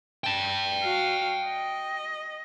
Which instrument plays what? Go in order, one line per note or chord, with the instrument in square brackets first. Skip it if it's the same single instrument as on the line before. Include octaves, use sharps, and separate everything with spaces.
[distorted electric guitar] G5 A5
[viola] F#4 F5
D#5